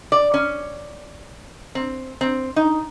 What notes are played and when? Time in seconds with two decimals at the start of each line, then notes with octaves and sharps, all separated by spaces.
0.12 D5
0.34 C#4
1.75 C4
2.21 C4
2.56 D#4